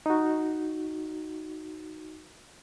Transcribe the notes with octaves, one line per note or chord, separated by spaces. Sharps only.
D#4 F#4